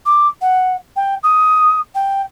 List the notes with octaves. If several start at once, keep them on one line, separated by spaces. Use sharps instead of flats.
D6
F#5
G5
D#6
G5